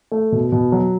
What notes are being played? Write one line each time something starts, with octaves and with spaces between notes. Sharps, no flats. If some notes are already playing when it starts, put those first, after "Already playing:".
A3
B2
B2
F#3